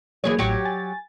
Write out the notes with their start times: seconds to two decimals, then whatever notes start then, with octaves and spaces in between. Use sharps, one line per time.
0.24 E3 F#3 A#3 G#4 C#5
0.38 A1 A2 F#3 G4 C#5
0.65 G#5 A6